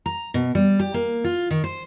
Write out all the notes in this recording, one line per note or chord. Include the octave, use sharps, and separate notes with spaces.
A#5
B2
G3
G4
A#3
F4
D#3
C5